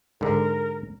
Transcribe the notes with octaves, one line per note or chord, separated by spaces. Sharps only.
G#2 D3 A#4